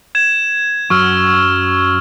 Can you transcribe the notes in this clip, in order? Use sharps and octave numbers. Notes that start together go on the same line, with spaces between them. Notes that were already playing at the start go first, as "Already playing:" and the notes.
G#6 E7
F#2 F#3 C#6 E6 F6